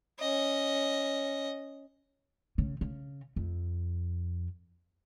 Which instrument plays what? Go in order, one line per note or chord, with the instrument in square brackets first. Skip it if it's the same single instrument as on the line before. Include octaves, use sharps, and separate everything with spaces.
[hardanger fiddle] C#4 D#5
[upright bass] C#3
C#3
F2